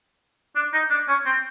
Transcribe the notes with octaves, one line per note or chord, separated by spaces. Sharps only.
D4
D#4
D4
C#4
C4